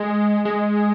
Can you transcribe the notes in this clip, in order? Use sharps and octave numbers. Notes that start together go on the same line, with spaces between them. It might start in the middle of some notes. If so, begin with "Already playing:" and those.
Already playing: G#3
G#3